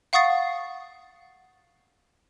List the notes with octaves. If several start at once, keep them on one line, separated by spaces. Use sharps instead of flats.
F5 F#5 C#6 D#6 A6 C7